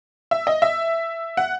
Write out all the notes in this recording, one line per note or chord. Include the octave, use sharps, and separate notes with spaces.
E5
D#5
E5
F#5